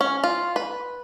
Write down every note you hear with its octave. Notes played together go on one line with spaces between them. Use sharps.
C#4
F4
B4